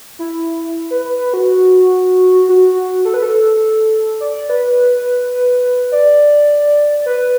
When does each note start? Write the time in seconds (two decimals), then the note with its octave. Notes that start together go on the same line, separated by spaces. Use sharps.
0.19 E4
0.91 B4
1.05 B4
1.20 B4
1.34 F#4
2.49 F#4
3.05 A4
3.14 B4
3.22 A4
4.21 D5
4.49 B4
5.92 D5
7.06 B4